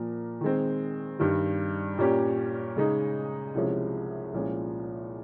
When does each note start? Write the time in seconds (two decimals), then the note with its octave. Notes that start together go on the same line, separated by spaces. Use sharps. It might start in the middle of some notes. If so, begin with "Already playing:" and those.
Already playing: A#2 F3 A#3 A#4
0.41 D#3 G#3 C4
1.19 G2 D#3 G3
1.98 A#2 G3 A#3 C#4 G4
2.77 C#3 G#3 D#4
3.54 C2 C3 F3 G#3 C#4
4.33 C2 A#2 F3 G#3 C#4